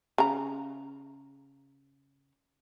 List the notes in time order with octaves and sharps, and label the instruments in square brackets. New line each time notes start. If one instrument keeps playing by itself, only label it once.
[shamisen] C#3 A#5